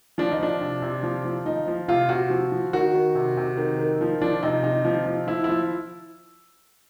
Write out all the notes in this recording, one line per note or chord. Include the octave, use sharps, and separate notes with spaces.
F3 D4
D#4
F3 D4
C3
C3
F3
F3
F3 D#4
F3
C3 F4
C3 F#4
F3
F3
D#3 F#4
D#3
C3
C3
D#3
D#3
F3
F3 D4
C3 D#4
C3 D#4
F3
F3
F3 E4
F3 E4